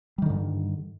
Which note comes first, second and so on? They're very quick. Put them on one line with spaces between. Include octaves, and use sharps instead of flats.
G3 D#3 D3 G2